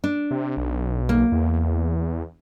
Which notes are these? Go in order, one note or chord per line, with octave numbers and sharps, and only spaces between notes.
D4
C3
B1
A#3
E2